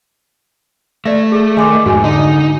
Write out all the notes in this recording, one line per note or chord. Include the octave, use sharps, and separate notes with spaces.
A3 D5 E5
G#4
D#3 G#5 C6 D6
F1 G#2 F#4 G#5
D3 D#4